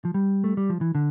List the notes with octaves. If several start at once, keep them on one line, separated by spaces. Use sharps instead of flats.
F3
G3
A3
G3
F3
E3
D3